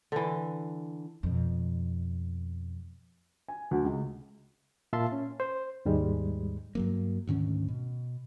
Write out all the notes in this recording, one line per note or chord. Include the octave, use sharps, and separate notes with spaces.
D3 E3
F2 B2
G#5
D2
C#2
A#2 E5 F5 A5 C6
C#4
C5
D#2 G#2 G3 G#3
G2 F#3 A#3
D2 G#2 D#3 C#4
B2